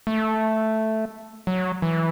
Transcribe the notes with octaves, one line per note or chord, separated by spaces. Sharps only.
A3
F#3
E3